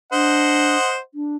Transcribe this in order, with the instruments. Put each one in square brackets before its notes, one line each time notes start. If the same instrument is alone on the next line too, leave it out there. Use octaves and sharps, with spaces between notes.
[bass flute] D4 [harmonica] C5 D#5 F#5
[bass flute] D4